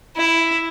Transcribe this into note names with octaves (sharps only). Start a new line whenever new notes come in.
E4